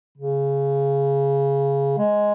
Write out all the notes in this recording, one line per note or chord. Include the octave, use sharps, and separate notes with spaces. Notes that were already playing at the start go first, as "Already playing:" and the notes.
C#3
G#3